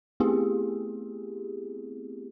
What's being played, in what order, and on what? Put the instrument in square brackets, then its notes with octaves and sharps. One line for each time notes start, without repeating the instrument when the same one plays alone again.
[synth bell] A3 B3 C4 E4 G4 G#4